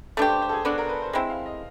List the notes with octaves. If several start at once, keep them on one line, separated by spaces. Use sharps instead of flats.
A3 D4 G4 B4
C5
C5
A4
G#4
B3 D4 F#4 A4
A#4
B4
C5
G#3 C4 E4 C5
F5
D#5